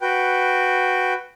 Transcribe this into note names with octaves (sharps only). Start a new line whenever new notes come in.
F#4 B4 G5